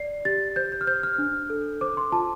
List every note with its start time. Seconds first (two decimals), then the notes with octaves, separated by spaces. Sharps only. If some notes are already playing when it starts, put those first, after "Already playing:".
Already playing: D5 C7
0.25 G4 A6
0.56 C5 G6
0.72 G6
0.81 F6
0.87 C5 G6
1.03 F6
1.18 D4
1.50 A4
1.81 C5 D6
1.97 C6
2.12 F4 A5